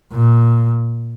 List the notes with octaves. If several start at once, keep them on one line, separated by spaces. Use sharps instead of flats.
A#2